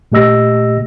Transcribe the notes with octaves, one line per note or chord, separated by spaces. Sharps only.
A#2 A3 G4 D#5 E6 A#6